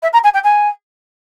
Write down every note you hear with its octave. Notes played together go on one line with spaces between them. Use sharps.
E5
A#5
G#5
G5
G#5